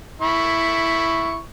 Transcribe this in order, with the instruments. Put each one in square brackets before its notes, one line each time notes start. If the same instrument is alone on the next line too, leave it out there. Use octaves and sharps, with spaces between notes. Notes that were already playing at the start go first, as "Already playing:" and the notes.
[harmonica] E4 B5 C#6